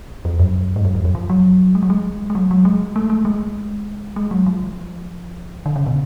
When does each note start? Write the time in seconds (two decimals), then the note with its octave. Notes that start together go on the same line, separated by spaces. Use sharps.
0.25 F2
0.39 F#2
0.76 G#2
0.85 F#2
0.95 F2
1.05 F#2
1.15 F3
1.30 F#3
1.75 G#3
1.83 F#3
1.90 G#3
2.30 G#3
2.35 F#3
2.51 F#3
2.65 G#3
2.96 A3
3.10 A3
3.25 G#3
4.16 G#3
4.31 F#3
4.46 F3
5.66 D3
5.76 C#3
5.86 B2